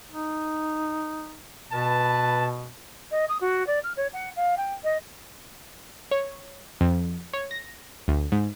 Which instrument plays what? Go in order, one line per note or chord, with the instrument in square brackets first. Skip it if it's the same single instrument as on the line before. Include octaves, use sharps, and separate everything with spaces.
[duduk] D#4
[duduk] B2 [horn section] B4 A5
[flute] D#5
D#6
F#4
D5
F6
C#5
F#5
F5
G5
D#5
[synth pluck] C#5
F2
C#5
A#6
D2
G#2